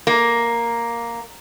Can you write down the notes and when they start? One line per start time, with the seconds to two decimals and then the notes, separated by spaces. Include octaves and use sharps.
0.07 A#3